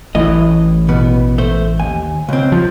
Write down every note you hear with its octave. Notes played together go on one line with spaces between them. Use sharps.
A1 A2 E3 D#5
B2 B3
A3 C5
D#2 G#5
C#2 C4
F3